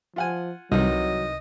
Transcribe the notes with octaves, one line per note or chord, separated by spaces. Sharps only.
F3 F4 F#5 G#5
C2 C3 D#3 E3 F#3 D#5